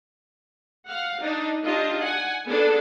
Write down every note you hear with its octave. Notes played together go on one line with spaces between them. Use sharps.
F5 F#5
D4 D#4
D4 D#4 F4 G4 D#5
F#5 G#5
B3 D4 G#4 A4